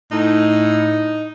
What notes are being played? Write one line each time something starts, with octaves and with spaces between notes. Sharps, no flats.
A2 D#4